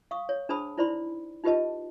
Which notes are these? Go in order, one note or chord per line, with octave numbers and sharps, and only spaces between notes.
F5 C#6 D#6
C#5
D4 G#4 C5 A5 B5 D#6
D#4 E4 C5 D5 B5 C6
D#4 F4 G4 B4 D#5 A5